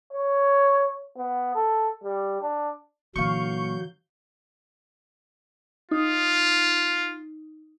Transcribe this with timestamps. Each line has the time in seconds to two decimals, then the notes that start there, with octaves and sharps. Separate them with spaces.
0.13 C#5
1.17 B3
1.55 A4
2.04 G3
2.42 D4
3.16 A#2 D3 E3 F#3 F5 C#6 G6
5.91 D#4 F4